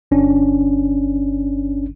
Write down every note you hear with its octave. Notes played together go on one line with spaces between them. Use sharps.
G1 C#4 D4